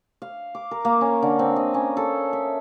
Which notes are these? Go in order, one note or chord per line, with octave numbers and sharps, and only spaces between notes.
F5
D6
A#4
A#3
C#4
D3
C4
D#5
C#4
A4
E5